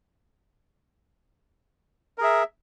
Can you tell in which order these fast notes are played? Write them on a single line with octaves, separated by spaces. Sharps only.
A#4 G#4 E5